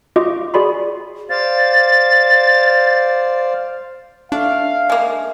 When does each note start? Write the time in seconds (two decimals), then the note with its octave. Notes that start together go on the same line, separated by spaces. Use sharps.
0.16 F4 F#4 D#5 D6
0.54 F#4 G#4 D5 B5 C6
1.30 C5 D5 F5 A6
4.32 A3 D4 F5
4.90 G#3 A#3